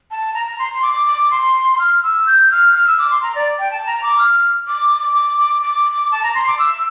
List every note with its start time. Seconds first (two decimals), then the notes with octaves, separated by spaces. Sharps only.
0.11 A5
0.34 A#5
0.59 C6
0.82 D6
1.07 D6
1.31 C6
1.79 F6
2.03 E6
2.27 G6
2.51 F6
2.75 F6
2.87 E6
2.99 D6
3.11 C6
3.23 A#5
3.35 D5
3.59 G5
3.71 A5
3.86 A#5
4.03 D6
4.19 F6
4.68 D6
5.15 D6
5.38 D6
5.62 D6
6.12 A5
6.23 A#5
6.35 C6
6.47 D6
6.59 E6